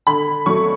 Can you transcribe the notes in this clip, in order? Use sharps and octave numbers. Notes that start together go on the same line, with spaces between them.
D3 B5
F#3 A3 C#6